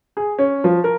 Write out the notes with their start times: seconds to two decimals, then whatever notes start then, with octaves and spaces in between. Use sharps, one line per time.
0.17 G#4
0.39 C#4
0.64 F3
0.84 A#4